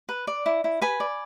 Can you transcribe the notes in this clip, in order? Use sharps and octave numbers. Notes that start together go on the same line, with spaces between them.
B4
D5
E4
E4
B4 G#5 B5
D5